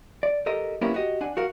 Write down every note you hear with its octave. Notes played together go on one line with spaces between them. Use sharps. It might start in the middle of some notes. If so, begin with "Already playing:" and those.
D5
G4 A4 A#4 D#5
A#3 B3 C#4 E4 G4 A#4
F#4 G4 D#5
D4 F#5 G#5
F#4 A#4 F5